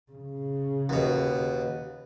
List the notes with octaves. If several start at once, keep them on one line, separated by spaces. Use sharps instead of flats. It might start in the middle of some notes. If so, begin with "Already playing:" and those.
C#3
D#2 B2